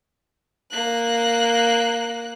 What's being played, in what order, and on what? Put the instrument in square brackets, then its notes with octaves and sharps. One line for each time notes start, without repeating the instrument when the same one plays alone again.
[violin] A#3 F#6